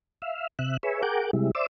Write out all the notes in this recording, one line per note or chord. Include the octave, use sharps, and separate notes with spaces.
E5 F5
C3 E5 F#6
G#4 B4 C#5 E5
G#4 A#4 F#5 G5 D6
C3 G3 G#3 E4
C5 D5 E5 D6 E6